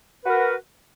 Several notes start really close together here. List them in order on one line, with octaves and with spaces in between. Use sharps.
B4 F#4 A#4